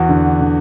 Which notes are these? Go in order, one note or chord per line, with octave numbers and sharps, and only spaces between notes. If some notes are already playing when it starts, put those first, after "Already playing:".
Already playing: E2 F#4
D3
D3